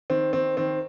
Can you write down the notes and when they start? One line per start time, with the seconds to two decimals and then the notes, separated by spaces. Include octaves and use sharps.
0.10 D#3 C4
0.33 D#3 C4
0.57 D#3 C4